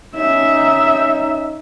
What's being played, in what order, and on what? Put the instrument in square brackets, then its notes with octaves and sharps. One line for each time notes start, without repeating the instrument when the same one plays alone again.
[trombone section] C#4 D#4 [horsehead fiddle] E5